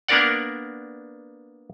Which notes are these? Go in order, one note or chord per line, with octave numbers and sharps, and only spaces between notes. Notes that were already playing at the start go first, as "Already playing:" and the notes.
A#3 B3 D4 A#4 D5 F#5